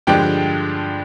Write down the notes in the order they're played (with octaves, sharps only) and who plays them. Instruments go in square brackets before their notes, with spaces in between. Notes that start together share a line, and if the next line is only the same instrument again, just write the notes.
[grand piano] G2 D3 F3 G#3 D4 G4 G5